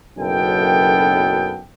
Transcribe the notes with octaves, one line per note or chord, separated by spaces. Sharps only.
F#1 B1 F#2 B3 A4 G5